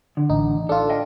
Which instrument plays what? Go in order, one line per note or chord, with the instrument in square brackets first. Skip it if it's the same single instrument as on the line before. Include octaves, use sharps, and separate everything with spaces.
[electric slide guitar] D3
[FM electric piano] A1 D#4
[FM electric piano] D4 F4 [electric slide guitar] A4
[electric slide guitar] D#5 G5